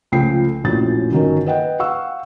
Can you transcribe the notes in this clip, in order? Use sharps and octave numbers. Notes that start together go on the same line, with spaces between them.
C#2 F3 A3 G5 C7
A#1 F#2 A2 F3 A6
G1 D#3 F#3 C#4 A#4
B4 D#5 F#5 G5
F5 F#5 C#6 E6